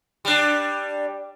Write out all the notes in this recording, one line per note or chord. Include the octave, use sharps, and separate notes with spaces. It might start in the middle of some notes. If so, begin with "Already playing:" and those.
G3 D4